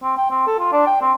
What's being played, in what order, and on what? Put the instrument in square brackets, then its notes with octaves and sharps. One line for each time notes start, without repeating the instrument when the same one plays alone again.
[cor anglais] C4
G5
C4
A4
F4
D4
G5
C4